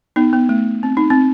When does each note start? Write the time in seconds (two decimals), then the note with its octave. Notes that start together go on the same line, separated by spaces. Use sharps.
0.16 B3 D#4
0.33 B3
0.49 A3
0.83 C4
0.97 D#4
1.10 C4